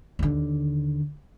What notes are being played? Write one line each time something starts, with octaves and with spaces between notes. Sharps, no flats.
D#2 D3